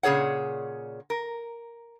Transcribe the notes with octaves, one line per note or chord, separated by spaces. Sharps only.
A#2 C#3 G#4 C#5 F#5
A#4